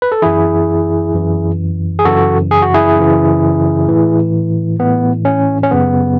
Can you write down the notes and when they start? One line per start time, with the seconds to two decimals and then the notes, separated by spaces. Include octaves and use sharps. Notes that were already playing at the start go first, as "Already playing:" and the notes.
0.02 B4
0.12 A4
0.22 F#2 E3 E4 G#4
1.14 F#2 E3
1.99 G#4
2.05 F#2 C#3 E3 F#4 A4
2.51 G#4
2.62 F#4
2.74 E4 G#4
2.97 F#2 C#3 E3
3.88 A2 E3
4.79 A2 E3 B3
5.25 C#4
5.63 C#4
5.71 F#2 C#3 F#3 B3